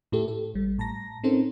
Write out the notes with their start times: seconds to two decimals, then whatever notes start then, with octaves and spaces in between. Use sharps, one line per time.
0.12 A2 E4 G4 A4
0.28 A4
0.54 A1 G3
0.78 A2 A5 A#5 A#6
1.24 C4 C#4 D#4 A4 A#4 C5